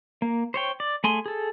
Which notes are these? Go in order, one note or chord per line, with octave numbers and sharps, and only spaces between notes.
A#3
C5 C#5 G5
D5
A3 G#4 G#5 C6
G#4 A4